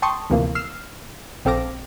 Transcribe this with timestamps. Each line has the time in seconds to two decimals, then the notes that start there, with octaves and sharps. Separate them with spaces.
0.02 G5 A5 C6 C#6 D#6
0.30 D2 C3 E3 F3 A#3
0.55 E6 F6 C7 E7
1.45 A#1 C4 A4 F5 D6 A#6